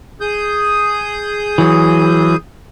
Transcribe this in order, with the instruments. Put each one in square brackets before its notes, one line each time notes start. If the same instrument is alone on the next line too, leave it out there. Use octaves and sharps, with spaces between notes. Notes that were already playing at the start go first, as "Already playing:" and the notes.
[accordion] G#4 D#6 G6
[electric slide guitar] E3 F#3